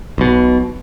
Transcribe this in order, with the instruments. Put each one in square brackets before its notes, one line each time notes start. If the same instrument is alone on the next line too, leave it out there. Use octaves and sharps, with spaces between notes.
[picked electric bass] B1 B2